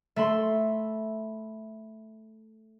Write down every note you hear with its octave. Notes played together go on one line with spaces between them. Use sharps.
A3 E5 B5 C6